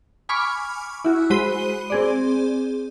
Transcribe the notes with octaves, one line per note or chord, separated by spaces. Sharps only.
G#5 B5 C#6 D6 F6
E4 F#4
G#3 F#4 C5 B5 D#7 G7
C4 G#4 D5